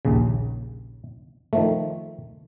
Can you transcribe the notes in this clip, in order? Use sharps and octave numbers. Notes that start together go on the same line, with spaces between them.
A#1 D#2 C#3
D#3 F3 A3